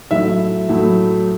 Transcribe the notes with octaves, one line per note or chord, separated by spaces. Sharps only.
A2 F#3 A3 E4 E5
A2 F#3 A3 E4